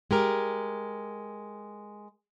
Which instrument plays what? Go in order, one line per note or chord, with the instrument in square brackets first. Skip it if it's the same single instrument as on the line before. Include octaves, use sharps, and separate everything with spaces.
[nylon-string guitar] G#3 G4 A#4